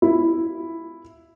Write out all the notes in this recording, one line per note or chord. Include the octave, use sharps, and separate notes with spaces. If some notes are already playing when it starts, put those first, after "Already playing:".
E4 F4